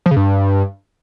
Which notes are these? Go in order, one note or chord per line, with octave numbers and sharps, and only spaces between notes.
F3
C#3
G2